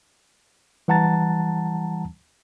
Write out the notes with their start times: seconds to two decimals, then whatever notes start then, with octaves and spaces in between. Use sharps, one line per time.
0.88 E3 G3 F#5 A5 A#5 A6